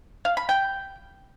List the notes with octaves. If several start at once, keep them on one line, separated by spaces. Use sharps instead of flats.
F5
B5
G5